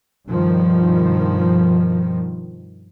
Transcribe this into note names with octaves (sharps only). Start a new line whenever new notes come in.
G2 B2 D#3 F3